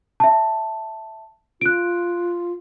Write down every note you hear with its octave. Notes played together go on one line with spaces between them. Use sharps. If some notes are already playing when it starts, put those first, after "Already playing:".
E5 A5
F4 F#6 D7